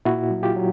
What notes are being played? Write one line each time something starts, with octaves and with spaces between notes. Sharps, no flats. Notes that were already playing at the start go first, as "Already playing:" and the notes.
A#2 E4 F#4
F#3
F4 G4
F#3